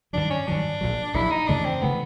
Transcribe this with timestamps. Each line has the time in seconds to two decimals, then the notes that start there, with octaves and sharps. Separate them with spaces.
0.13 G2 D#3 F#3 D4
0.30 C#4
0.48 G2 D#3 F#3 D4
0.81 A#1 A#2 F#3
1.14 A#1 A#2 F#3 E4
1.31 D#4
1.48 F#2 C#3 E3 A3 D4
1.65 C4
1.82 C#3 E3 A3 B3